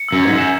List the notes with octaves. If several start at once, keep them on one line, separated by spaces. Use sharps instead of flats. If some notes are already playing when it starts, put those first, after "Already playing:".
Already playing: C#7
F#2 E6
G#2 G#6
F#2
E7